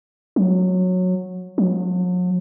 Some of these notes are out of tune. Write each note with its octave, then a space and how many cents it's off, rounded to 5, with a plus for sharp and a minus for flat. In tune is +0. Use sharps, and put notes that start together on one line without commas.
F#3 -15
F#3 -45